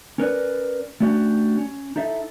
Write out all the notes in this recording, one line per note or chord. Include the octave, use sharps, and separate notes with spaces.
C#4 A#4 B4 D5
A3 C#4 D4 F#4 G4
C#4
D#4 E4 A4 E5